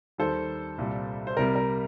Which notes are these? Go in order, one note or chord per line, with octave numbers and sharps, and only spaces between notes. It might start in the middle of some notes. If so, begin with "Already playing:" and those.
D#2 D#3 G3 A4 C5
C2 A#2 G3
C5
C2 C3 G3 A#4
A#4